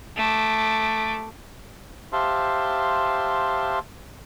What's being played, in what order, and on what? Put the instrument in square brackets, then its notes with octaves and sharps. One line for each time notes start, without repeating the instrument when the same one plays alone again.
[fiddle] A3 D6
[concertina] G4 C5 E5 F5 A5 C6